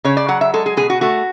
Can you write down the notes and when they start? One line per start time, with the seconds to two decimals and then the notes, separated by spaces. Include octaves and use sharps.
0.04 C#3 C#5
0.17 D5
0.28 F#3 F#5
0.41 E5
0.54 G#3 A4
0.66 G#4
0.77 B2 G#4
0.90 F#4
1.01 A3 F#4